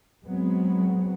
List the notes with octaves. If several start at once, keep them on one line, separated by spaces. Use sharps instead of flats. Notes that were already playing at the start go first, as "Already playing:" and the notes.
F#3 G#3 B3 C4